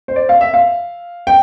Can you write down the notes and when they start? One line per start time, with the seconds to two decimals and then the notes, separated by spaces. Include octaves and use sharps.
0.08 C5
0.16 D5
0.29 F5
0.41 E5
0.54 F5
1.27 G5